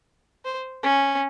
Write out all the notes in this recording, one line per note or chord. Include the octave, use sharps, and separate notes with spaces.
C5
C#4